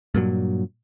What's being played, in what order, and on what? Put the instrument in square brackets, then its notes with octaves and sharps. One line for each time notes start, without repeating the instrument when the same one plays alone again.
[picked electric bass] G2 A#2 F#3